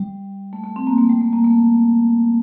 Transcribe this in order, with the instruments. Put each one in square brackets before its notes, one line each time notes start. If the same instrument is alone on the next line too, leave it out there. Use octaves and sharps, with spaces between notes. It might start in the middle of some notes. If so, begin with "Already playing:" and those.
Already playing: [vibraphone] G3
A3
A3
C4
A#3
A3
G3
A3
A#3
A3